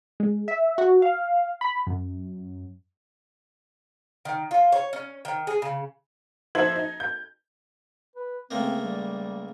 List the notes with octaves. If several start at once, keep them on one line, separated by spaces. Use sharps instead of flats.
G#3
E5
F#4
F5
B5
F#2
D#3
F4
C#5
C#4
D#3
G#4
C#3
F3 D#4 C5 E5 G#6 F#7
D#4
G6
B4
C#2 A3 A#3 C4
G3